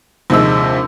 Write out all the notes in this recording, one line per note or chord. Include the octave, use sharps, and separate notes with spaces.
A#1 D#2 C3 G#3 E6